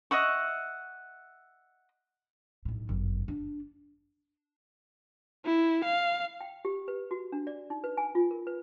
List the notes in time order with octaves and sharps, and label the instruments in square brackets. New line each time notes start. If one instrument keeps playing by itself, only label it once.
[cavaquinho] D#5 E5 F#5 C#6
[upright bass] B1 A2
G1 F#2
D4
[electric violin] E4
F5
[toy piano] G5
G4
B4
F#4
D4
D5
D#4
B4
G#5
F4
A#4
B4